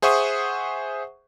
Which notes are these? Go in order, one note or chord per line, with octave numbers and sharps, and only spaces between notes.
G#4 C5 E5 F#5 C#6 D#6